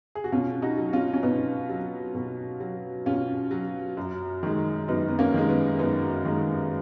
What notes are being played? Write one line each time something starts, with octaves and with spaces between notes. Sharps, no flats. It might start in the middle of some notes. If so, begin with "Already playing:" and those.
G#4
F#4
B2 C#4 F4
D#4 F#4
F#3
C#4 F4
C#4
B2 B3 D#4
F#3
B2
F#3
B2 C#4 F4
F#3
F#2
D#3 G#3
F#2 B3 D#4
B3
A#3 C#4
D#3 G#3
B3
F#2 B3 D#4
D#3 G#3